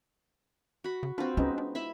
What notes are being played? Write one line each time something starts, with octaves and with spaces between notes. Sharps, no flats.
F#4 B5
C#3
C4 D4 F4 F#4 B4
C#2 G#3 B3 C#4 D#4
D4
E4 E5 B5